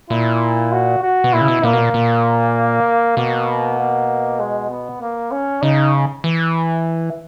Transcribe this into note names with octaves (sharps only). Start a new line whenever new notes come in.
A#2 E4
F#4
F#4
B2
A#2 E4
C#3
B2
A#2 A#3
B2
A#2
A#2
B2 A#3
A#3
G#3
B3
A#3
C#4
C#3 D#4
E3